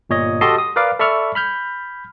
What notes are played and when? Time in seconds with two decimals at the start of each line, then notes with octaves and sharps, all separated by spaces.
0.10 G1 A#2 C#5 D#5
0.41 F#4 G4 A4 D#5 A5 C6
0.58 D#6
0.76 A#4 B4 D5 F5 D6
0.99 A4 D5 E5 B5 C#6 F6
1.35 B5 F6 G6